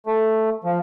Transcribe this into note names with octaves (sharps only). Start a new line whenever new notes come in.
A3
F3